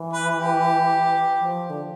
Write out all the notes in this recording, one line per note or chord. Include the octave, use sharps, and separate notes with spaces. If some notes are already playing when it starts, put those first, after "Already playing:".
Already playing: E3
B4
G4
F3
D3